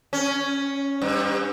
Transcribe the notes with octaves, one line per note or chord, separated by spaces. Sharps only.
C#4
G2